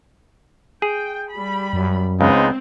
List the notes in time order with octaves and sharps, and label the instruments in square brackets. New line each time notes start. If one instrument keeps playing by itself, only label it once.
[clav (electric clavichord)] G#4 [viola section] G5
[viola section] G3 B5
[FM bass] F#2
[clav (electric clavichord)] C#2 [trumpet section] G#3 B3 D#4 [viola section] C4